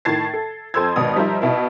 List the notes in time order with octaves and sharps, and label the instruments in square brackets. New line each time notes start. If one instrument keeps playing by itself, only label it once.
[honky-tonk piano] A2 D#3 A5 G#6 A6 C7
A4
F2 A4 C5 C6 E6 G#6
G#1 B2 D#6
F3 G3 D#4 A#4 C5 E5
B2 E4